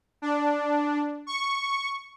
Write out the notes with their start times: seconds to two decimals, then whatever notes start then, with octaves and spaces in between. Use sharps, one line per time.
0.22 D4
1.27 C#6